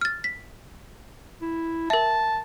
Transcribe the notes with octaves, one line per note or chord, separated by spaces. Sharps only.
F6 A6
B6
E4
A#4 E5 A5